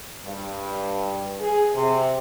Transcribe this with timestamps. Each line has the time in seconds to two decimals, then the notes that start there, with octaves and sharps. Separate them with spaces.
0.25 G2
1.40 G#4
1.75 C3